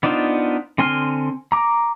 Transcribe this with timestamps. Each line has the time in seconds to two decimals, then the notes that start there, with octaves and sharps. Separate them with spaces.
0.03 B3 D4 D#4 F4 C5
0.78 D3 C4 G#5 C6 F6
1.52 A#5 D6